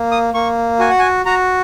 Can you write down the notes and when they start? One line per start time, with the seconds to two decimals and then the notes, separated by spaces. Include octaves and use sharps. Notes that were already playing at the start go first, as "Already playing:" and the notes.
Already playing: A#3
0.11 D#6
0.34 A#3 C#6
0.79 F#4 G#5
0.90 F#5
0.99 G#5
1.25 F#4 A#5